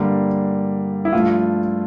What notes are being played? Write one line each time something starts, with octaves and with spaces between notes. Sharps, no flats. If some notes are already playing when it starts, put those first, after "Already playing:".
Already playing: G2 D3 G3 A#3
E4
G2 F3 A3 F4